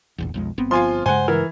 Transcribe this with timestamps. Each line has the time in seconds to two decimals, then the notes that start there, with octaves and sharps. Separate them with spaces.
0.18 F1 A#1 E2
0.34 B1 F2 G#3
0.58 G1 B3 C4
0.71 F3 F4 G#5 C6
1.06 G2 C#3 G#3 C5 F#5 G#5
1.28 E3 A#4